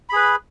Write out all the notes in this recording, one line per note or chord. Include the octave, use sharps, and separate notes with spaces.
G#4 B4 B5